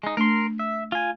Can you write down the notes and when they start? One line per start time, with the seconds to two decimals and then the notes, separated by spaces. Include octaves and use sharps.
0.03 G#3 D#4
0.17 A3 D4 A#4 C6
0.59 E5
0.92 F4 G#5